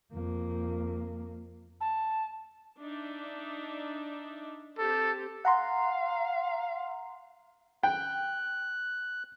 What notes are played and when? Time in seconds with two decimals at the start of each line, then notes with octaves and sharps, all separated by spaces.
0.13 F2 A#3
1.81 A5
2.79 D4 D#4 E5
4.78 C4 G4 A4 C5
5.45 F5 F#5 A#5 C6
7.83 G5 F#6